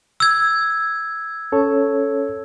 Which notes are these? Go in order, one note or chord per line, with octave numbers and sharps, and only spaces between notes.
E6 G#6
C#4 A4 C#5